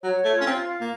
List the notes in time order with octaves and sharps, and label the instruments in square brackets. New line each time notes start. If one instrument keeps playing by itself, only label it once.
[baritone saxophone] F#3 [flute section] C#5
[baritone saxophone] A3
[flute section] F4
[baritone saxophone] C#4
C4
[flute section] F5
[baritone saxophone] A#3